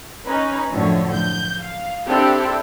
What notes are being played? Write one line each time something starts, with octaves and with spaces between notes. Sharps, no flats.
C#4 D#4 B4
F#2 A2 D3 F3 C#5
G6
F5
C4 D4 E4 G4 A4